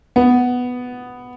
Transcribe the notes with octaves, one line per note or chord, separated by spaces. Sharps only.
B3